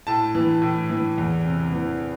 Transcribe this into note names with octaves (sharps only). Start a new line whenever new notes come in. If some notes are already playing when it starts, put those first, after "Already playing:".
A2 A5
E3
A2
E3
E2
C3
E3